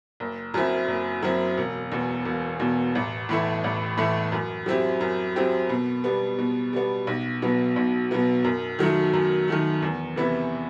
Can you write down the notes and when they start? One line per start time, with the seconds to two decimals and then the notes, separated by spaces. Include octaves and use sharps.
0.20 F#1
0.54 F#2 F#3 C4 E4
0.88 F#1
1.22 F#2 F#3 C4 E4
1.57 E1
1.92 E2 B2
2.25 E1
2.60 E2 B2
2.95 A1
3.29 A2 E3 A3 E4
3.64 A1
3.97 A2 E3 A3 E4
4.32 F#2
4.66 F#3 C4 E4 G4
5.01 F#2
5.36 F#3 C4 E4 G4
5.69 B2
6.04 G3 B3
6.39 B2
6.73 G3 B3
7.07 B1
7.42 B2 F#3 B3
7.76 B1
8.11 B2 F#3 B3
8.44 F#2
8.79 D#3 F#3 A3
9.13 F#2
9.48 D#3 F#3 A3
9.82 E2
10.16 C3 E3 B3 E4